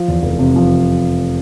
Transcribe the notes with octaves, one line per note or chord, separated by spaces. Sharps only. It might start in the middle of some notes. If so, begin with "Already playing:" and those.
Already playing: F3
E2
F1
C3
F3